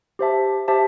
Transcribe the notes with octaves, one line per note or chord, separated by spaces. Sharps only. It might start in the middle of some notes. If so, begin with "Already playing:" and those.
G4 C5 E5 A5
G4 C5 E5 A5